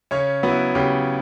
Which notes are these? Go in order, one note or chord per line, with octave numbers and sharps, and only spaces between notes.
C#3 C#4 C#5
F#3 B3 B4
E4
C#3 G4